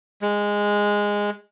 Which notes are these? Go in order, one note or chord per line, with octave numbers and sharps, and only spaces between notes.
G#3